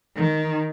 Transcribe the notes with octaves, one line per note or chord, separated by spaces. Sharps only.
D#3